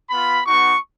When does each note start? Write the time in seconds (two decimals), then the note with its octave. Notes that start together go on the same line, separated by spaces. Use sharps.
0.10 B3 F4 B5
0.46 B3 D#4 F#4 C#6